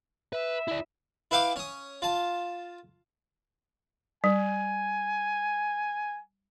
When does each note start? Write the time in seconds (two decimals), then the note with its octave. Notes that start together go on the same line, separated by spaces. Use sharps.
0.33 B4 E5
0.68 E4 D5
1.31 E4 B4 F5 G5 D6
1.56 C#4 D#6
2.02 F4 A5
4.24 G3 G#5